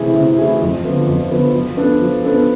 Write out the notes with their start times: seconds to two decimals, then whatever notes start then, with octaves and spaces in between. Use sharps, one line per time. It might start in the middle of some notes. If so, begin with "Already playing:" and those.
Already playing: C3 E3 A3 E4 G#4
0.14 C3
0.38 E3 A3 E4 G#4
0.61 F2
0.85 D3 F3 B3
1.07 F2
1.30 D3 F3 B3
1.54 F3
1.77 B3 D4 A4
2.01 F3
2.24 B3 D4 A4